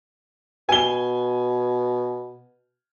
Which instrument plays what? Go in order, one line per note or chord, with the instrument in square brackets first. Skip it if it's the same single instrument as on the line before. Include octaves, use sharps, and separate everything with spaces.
[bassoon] B2 [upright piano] G#5 G7